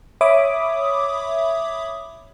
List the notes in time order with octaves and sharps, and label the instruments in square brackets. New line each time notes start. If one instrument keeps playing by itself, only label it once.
[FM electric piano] C#5 E5 B5 D6 D#6